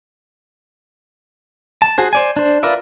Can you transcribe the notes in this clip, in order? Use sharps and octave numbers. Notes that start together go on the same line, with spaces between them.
A5
F#4 G#4 C5
C5 D5 G#5
D4 C5
F4 A#4 B4 D5 E5